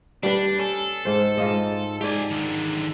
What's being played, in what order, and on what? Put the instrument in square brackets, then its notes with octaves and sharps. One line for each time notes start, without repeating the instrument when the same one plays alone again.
[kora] G3 G4 B4 [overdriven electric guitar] D4
[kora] C#4 [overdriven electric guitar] A4
[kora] G#2 C5
G#2 F4 D#5
[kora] G#2 D5 [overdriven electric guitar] G4 G#5
[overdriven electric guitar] D3 D#3